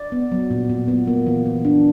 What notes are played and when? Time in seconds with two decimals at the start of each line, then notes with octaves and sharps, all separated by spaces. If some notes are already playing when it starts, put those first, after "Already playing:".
Already playing: D5
0.12 B3
0.32 F#3
0.51 A#2
0.70 A#2
0.88 B3
1.07 A#3
1.27 E3
1.46 E3
1.65 D4